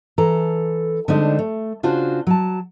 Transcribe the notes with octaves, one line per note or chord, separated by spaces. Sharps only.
E3 A4 A#5
D3 G3 G#3 C4 D4 D#4
A3
C#3 D4 F4 F#4 C5
F#3 A5